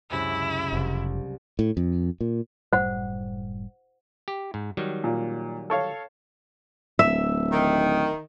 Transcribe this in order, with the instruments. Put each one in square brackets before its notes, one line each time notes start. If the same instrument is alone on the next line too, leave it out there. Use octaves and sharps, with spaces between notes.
[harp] C#2 F#2 C3 [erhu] E4
[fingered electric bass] F1 [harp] C2
[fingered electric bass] A2
F2
A#2
[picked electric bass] F#1 A2 G3 [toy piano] C5 F#5
[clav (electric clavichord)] G4
G#2
D#3 F#3 G3
[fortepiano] A#2
A4 C#5 F5
[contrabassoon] D1 [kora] E5
[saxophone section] D#3